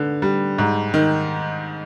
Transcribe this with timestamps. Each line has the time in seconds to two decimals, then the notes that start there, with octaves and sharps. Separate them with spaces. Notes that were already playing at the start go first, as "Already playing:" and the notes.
Already playing: D3 B3
0.22 G3
0.58 G#2
0.94 D#3